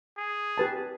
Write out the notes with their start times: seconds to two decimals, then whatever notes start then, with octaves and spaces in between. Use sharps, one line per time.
0.17 G#4
0.58 G4 B4 A5